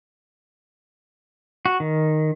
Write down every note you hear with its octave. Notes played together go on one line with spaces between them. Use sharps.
F#4
D#3